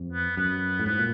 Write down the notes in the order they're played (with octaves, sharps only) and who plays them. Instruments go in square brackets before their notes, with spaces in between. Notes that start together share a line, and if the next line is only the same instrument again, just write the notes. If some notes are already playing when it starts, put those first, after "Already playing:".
Already playing: [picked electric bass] F2
[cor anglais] B3
[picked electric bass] F#2 [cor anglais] B3
[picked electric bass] A2
[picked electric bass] G#2 [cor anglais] B3
[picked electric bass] A#2